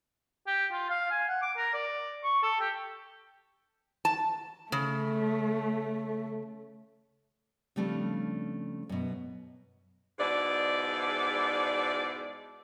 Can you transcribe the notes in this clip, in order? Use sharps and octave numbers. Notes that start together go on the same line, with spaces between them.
G4
F4
F5
G#5
F#5
D6
A#4
D5
C#6
A4
G4
A5
C#3 A3
C#3 F3 G3 A3 C4 D4
F#2 B2
G#2 B2 E4 D5